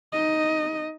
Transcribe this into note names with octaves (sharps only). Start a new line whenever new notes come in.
D#4 D#5